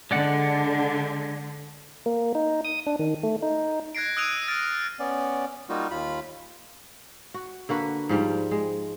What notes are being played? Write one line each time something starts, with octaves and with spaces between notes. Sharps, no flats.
D3 G#3 D5 F#5
A#3
D#4
D#6
D4
D#3
A3
D#4
F#6 G#6 A#6 C7 D7
D#6 E6 F#6 D7 D#7 F7
F6 A6 A#6 D7
B3 C#4 D5
G3 A#3 D#4 F4 F#4
D#2 F4 B5
F#4
D3 A#3 F#4 B4
G#2 F3 G3
G#3